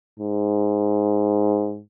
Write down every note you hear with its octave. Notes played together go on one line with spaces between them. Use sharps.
G#2